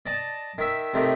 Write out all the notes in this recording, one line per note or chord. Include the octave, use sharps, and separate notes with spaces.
D5 D#5 A5
D#3 E5
C3 D#3 A3 D#4